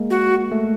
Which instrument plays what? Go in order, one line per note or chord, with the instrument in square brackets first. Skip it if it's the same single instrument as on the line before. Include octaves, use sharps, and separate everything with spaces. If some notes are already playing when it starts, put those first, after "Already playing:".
Already playing: [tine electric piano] G#3 A#3
[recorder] F#4
[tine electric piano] A3